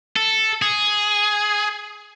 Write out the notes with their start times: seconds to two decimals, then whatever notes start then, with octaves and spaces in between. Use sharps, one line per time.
0.16 A4
0.62 G#4